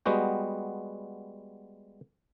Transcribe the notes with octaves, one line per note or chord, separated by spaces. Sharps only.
G3 G#3 B3 F#4 G5